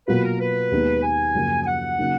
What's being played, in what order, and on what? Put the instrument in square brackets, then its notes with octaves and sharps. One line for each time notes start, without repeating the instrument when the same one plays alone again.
[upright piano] B2 F#3 A#3 F4 [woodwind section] B4
[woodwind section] A#4
B4
[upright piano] D#2 D#3 G#3 B3 D#4
[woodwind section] G#5
[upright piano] F#2 C#3 F3 A#3 F4
[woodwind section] G#5
F#5
[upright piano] C#3 F#3 A#3 D#4